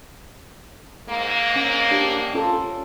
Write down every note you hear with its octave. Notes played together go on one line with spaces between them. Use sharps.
G#2 A#3
C#4
D4 G4
C#4 F4 A4